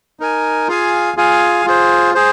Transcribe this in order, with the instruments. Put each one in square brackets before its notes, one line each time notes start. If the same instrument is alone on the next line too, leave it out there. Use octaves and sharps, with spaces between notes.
[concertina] D#4 A#4 G#5
F4 G#4 F5 G#5
F4 G#4 F5 G#5
F4 G#4 C5
G#4 C5